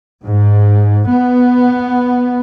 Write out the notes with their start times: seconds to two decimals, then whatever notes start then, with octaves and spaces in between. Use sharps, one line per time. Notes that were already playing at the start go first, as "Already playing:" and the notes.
0.25 G#2
1.10 B3